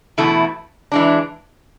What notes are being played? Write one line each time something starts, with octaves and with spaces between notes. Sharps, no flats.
E2 B2 A3 E4
E3 G#3 D4